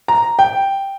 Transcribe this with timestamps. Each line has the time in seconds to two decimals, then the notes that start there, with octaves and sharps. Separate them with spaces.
0.08 A#5
0.39 G5